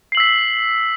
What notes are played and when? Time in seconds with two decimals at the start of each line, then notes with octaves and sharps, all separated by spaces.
0.12 C7
0.15 F#7
0.17 E6
0.20 B6